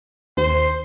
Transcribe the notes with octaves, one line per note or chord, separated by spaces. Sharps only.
D#2 C5